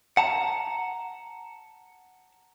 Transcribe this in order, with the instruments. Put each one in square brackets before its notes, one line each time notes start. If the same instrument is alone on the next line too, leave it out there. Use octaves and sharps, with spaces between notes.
[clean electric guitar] F#5 A5 A#5